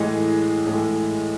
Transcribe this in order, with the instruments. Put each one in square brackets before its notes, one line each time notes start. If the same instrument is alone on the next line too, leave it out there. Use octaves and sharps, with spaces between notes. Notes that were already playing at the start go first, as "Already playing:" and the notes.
Already playing: [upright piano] A2 E3 G#3 D#5
A2 E3 G#3